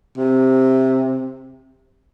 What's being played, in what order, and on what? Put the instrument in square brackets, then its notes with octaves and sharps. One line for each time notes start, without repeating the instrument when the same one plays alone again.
[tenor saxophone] C3